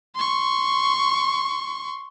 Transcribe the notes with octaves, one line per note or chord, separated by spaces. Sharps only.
C6 C#6